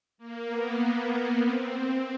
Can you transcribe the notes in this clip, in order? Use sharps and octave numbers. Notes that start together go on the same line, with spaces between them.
A#3
B3
C4